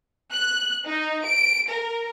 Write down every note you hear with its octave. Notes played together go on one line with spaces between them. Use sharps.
F#6
D#4
D7
A#4